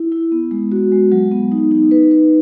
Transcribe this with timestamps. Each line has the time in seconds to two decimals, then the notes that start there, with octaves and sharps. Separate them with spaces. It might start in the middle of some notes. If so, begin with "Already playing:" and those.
Already playing: E4
0.12 E4
0.32 B3
0.51 G#3
0.72 F#4
0.92 G#3
1.12 F#3
1.31 B3
1.52 D#4
1.71 D#4
1.91 B4
2.11 B4